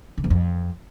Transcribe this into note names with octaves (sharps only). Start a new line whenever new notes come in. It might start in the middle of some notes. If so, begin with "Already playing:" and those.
C#3
E2
F2